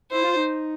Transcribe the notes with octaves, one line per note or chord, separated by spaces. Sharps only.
E4 C5
F4
D#4